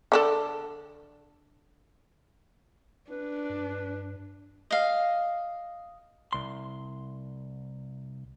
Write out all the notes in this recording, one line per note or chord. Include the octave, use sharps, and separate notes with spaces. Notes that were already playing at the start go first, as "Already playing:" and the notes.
D3 D4 A4
D4 B4
G2
D#5 F5
C2 C6